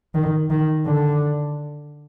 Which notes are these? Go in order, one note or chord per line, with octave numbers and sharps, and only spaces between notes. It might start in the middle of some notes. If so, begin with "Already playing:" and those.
D#3
D#3
D3